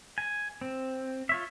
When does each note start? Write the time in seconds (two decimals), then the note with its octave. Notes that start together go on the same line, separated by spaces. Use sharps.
0.18 G#5
0.61 C4
1.29 F4 C#5 E5